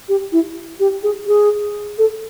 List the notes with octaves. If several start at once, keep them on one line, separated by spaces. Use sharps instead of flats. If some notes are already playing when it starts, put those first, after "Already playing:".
G4
E4
G4
G#4
G#4
A4